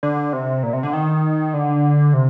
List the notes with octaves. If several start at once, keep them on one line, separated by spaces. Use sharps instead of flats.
D3
C3
A#2
C3
D3
D#3
D3
C3